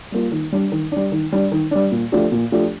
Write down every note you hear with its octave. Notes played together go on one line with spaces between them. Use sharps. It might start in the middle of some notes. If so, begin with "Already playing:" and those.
G3 A#3 F4
D#3
G3 D4
D#3
G3 D4
D#3
G3 D4
D#3
G3 D4
A#2
F3 A3 D4 G4
A#2
F3 A3 D4 G4